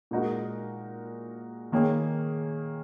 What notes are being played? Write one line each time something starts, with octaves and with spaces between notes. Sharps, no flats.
A#2 G#3 D#4 F#4 A#4
D#3 A#3 C#4 G#4